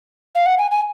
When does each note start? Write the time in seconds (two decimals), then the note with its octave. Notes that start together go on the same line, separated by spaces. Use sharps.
0.35 F5
0.46 F#5
0.58 G#5
0.71 G#5